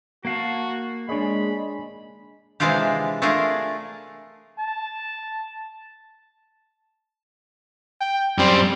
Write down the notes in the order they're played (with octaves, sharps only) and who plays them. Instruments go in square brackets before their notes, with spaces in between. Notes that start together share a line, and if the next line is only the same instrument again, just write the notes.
[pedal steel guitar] A#3 F5 A5 [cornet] F#4
[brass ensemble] G#3 [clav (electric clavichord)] D4 C#5 D#5 [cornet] B5
[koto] C3 E3 G#3 D4 F4 G4
A3 D4 F4 G#4 A#4
[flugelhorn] A5
[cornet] G5
[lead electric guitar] F#2 C4 [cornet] G3